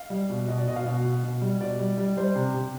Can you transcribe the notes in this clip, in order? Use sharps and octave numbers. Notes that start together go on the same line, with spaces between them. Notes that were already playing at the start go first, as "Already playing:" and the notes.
Already playing: F5
G3
B2
B2 D#5
D5
B2 D#5
F5
B2
B2
B2
G3
B2 D5
G3
G3
G3 C5
C3
C3